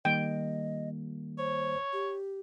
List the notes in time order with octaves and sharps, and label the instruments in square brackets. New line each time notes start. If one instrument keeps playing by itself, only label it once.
[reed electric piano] D#3 G3 A#3 [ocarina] D#5 [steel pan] G5
[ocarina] C5 [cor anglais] C#5
[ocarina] G4